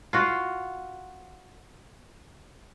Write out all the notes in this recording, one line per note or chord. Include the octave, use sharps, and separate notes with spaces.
F4 F#4